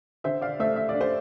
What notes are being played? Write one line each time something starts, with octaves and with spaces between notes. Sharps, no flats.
D3 C5 E5
D5 F5
A3 C5 E5
E5
D4 D5
C5